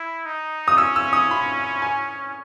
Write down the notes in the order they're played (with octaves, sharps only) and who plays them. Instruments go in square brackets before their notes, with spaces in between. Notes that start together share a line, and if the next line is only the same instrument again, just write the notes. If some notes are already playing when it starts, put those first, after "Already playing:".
Already playing: [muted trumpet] E4
D#4
[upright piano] D#6
[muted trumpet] C#4 [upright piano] E6
[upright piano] E6
D#6
B5
G#5